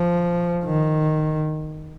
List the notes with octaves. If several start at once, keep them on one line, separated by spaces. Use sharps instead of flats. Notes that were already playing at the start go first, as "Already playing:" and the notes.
Already playing: F3
D#3